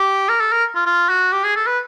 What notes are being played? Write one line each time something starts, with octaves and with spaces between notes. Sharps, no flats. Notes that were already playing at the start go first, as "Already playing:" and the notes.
Already playing: G4
A#4
A4
A#4
F4
F4
F#4
G4
G#4
A4
B4